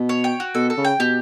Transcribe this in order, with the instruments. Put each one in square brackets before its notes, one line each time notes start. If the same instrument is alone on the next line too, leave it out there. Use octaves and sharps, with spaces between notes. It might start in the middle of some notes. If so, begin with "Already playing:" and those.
Already playing: [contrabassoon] B2
[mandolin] C#5
G5
F#4
[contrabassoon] B2 [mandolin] A4
[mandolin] A4
[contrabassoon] C#3
[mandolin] G5
[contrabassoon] B2 [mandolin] G4